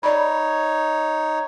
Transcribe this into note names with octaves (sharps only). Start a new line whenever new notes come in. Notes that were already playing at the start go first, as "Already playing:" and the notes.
D#4 C#5 D5 B5